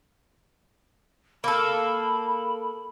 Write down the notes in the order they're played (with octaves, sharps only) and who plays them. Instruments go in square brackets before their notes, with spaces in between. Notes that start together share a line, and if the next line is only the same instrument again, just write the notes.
[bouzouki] A#3 A4 [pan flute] B5